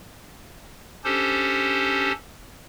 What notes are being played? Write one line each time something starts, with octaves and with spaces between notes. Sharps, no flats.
C#4 D4 G4 A4 C5